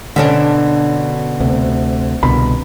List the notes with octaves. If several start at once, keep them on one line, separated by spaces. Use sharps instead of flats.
B2 D3 C#4 D4
D2 C3
C2 B2 D3 B5